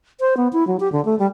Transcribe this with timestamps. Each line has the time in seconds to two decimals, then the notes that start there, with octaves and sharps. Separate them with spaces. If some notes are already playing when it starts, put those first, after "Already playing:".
0.20 C5
0.37 B3
0.53 E4
0.67 F#3
0.80 G4
0.92 D3
1.05 A3
1.19 G3